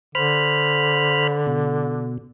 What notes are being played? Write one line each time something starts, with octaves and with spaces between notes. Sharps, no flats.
D3 C5 B5 F6
B2